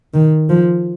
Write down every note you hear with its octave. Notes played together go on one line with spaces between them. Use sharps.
D#3
F3